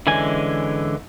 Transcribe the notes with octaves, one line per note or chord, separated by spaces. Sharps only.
D3 E3 G#3 C#4 G#5